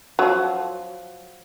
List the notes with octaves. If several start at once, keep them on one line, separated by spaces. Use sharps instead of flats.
F3 F#3